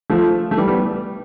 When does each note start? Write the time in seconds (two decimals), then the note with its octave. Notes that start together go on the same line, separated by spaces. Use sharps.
0.10 F3 A3
0.51 A3
0.57 E3 G3
0.68 G3 B3